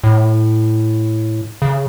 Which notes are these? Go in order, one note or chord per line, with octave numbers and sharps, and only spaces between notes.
A2
C#3